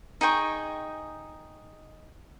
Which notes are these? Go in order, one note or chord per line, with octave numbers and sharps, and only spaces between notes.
D#4 G#4 G5 C#6